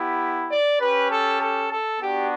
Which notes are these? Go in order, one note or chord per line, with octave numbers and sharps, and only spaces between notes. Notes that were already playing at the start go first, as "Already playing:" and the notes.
Already playing: B3 E4 G4
D5
C#4 G4 B4
A4
A4
A4
B3 D4 F#4 G4